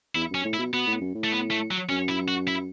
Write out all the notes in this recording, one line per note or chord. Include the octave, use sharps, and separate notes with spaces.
E2 E4
F#2 C#4
A2
E4
B2
B2 B3
A2
F#2
A2
A3
B3
A3
F#3
F#2 C#4
E4
F#4
E4